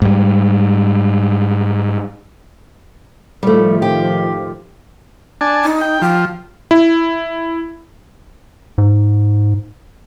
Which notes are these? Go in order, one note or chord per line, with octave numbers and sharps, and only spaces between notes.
G#2 G3
A2 D#3 F3 G3 A3
G4
D4 G#5 A5
D#4
G5
F3 G5
E4
G#2